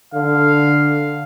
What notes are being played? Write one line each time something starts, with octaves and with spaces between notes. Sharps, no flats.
D3 F5